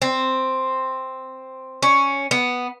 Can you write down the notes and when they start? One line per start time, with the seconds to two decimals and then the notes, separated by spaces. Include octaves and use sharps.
0.02 C4
1.83 C#4
2.31 B3